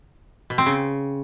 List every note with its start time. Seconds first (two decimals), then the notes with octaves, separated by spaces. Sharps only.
0.50 B2
0.58 C4
0.66 C#3